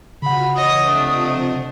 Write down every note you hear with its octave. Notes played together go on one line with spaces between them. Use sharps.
C#3 F4 F#4 F#5 B5 F6
E3 C#5 D#5 D#6
C3 F3 A3 D4 D#5